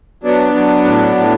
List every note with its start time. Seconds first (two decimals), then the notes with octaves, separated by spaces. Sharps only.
0.23 F#3 B3 D4
0.54 F#3
0.84 A2
1.16 A2